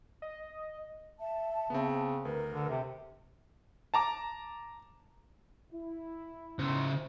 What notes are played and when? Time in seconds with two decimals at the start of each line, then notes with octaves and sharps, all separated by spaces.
0.22 D#5
1.20 E5 A5
1.70 C#3 B3 C4
2.25 D2 A#4 B4
2.53 D3
2.69 C3
3.94 A5 A#5 D6
5.72 E4
6.59 C#3 C5